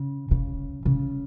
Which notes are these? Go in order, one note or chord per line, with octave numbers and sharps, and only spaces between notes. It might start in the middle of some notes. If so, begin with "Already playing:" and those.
Already playing: C#3
C#3
C#3